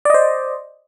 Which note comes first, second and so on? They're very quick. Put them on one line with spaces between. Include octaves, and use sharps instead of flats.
D5 D#5 C5